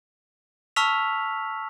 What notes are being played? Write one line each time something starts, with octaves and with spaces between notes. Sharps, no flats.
A5 C#6 E6 F6 B6 F7